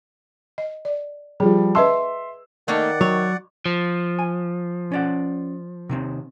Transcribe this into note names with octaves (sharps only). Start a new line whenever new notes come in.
D#5
D5
F3 G3 G#4
B4 D#5 E5 A5 C6 E6
D#3 A3 A#3 D#4 D5 F#5
F#3 C#5
F3
G#5
C#4 D5 F#5
C3 D#3 C4